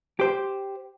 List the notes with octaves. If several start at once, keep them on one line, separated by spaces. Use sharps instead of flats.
G4 C5